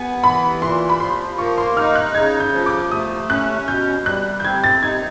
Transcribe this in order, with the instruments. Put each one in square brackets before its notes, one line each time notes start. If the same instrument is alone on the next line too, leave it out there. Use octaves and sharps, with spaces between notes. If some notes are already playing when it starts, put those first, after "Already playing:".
Already playing: [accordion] B3 [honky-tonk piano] G#5
[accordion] E3 [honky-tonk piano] B5
[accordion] A#2 [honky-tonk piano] C6
[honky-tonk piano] B5
[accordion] F3 [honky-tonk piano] C6
[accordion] A#3 [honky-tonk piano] C#6
[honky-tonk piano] C6
[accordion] D#4 [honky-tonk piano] F6
[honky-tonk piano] F#6
[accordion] C#3 [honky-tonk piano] G#6
[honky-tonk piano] G6
[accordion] F3
[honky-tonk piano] D6
[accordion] A3 [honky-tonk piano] D#6
[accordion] C#4 [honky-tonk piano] F#6
[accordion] B2 [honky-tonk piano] G6
[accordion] G3 [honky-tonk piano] F#6
[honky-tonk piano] G6
[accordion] C4 [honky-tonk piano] G#6
[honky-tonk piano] A6
[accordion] D#4 [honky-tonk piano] G#6